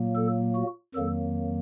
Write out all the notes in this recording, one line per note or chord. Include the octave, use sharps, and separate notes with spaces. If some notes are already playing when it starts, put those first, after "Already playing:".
Already playing: A#2 F#3 A#3
A4
F#4
F2 D#3 F#3 A#3 A4